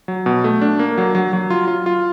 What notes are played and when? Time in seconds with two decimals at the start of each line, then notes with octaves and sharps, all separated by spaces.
0.08 F#3
0.26 B2
0.44 A3
0.62 D4
0.79 A#3
0.98 F#3
1.15 F#3
1.33 F#3
1.50 F4
1.68 F4
1.86 F4